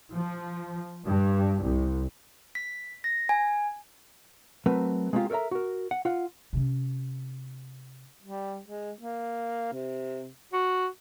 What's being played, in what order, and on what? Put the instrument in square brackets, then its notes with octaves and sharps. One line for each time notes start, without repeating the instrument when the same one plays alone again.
[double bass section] F3
G2
C2
[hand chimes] B6
A#6
G#5
[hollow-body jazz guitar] F#3 A3 C4 A#4 B4
G#3 A#3 C4 D4 F4 G4
A4 A#4 C5 E5 A#5
F#4 A#4
F#5
F4 F#5
[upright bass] C3 C#4
[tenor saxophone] G3
G#3
A#3
C3
F#4